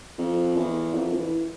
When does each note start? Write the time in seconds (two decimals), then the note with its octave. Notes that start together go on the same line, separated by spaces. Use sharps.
0.18 F2
0.56 E2
0.94 F2
1.12 E3